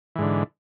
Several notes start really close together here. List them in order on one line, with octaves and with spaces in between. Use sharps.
E3 G#2 D3